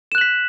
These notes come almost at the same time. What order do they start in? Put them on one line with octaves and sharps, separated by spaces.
E7 F#6 F#7 B6